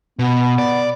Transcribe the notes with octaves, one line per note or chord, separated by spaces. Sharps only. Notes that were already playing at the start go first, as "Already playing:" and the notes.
B2 B3
D5